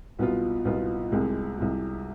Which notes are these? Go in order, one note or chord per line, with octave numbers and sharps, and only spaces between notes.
C2 B2 B3 F4
C2 B2 B3 F4
C2 C3 G#3
C2 C3 G#3